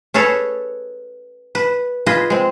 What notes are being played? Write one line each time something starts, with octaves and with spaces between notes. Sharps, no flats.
C#4 G#4 A4 B4 C#5
B4
F4 G#4 B4 D#5
G#3 C4